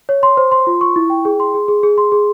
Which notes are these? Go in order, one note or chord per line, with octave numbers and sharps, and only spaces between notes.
C#5
C6
C5
C6
F4
C#6
E4
G5
G#4
C6
G#4
G#4
G#4
C6
G#4